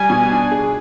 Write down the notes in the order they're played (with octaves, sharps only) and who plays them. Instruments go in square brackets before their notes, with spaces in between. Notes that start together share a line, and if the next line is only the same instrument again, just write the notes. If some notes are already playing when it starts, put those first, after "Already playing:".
Already playing: [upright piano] G3 [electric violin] G#5
[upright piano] B2
D4
G#4